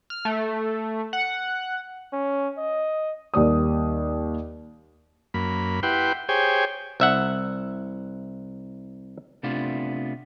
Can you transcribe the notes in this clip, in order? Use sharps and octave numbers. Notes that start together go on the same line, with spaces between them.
F6
A3
F#5
C#4
D#5
D#2 G3 D5 D#6
F#2 A#3 B5
E4 G4 B4 F#5 G5 C6
G4 G#4 C5 C#5 G5 G#5
C2 E5 F#5
C3 A3 B3 D4 F4